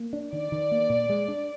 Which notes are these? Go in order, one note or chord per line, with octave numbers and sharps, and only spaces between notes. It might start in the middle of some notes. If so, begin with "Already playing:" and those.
Already playing: A#3
D4
D#3 D5
D#3
A#3
A#2
G#3
D4